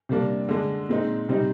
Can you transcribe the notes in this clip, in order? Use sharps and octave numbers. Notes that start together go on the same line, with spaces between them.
C3 G3 A#3 D4
D3 G#3 D4
A#2 G#3 C4 D#4
C3 G3 C4 D#4